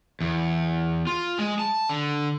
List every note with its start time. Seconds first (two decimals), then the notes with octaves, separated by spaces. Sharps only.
0.21 E2
1.07 F4
1.39 G#3
1.59 A5
1.89 D3